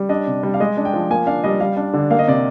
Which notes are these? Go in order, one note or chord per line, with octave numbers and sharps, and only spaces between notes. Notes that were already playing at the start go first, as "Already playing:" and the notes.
Already playing: G3
D4 D#5
C3
G3
F5
G#3 D#5
D4
G5
F3
A#3 G#5
D4 F5
G3 D#5
G3 F5
D4
D3
A#3 F5
D#5
C3 D5